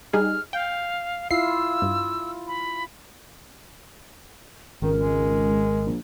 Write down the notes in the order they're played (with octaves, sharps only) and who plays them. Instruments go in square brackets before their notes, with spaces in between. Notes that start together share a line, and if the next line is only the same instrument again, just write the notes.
[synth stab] G3 D#4 G#4 [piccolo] F6
[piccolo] F5 [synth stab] G5
[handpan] E4 F4 F5 [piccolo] E6 [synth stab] C7
[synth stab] G2
[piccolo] B5
[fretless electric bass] G#1 [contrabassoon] C#2 [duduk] D#3 [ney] A#4
[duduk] G#3
[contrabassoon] A#1